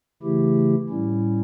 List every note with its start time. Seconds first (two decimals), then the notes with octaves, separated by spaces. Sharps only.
0.22 C#3 E3 A3 E4 G4
0.89 A2 G3 C#4 E4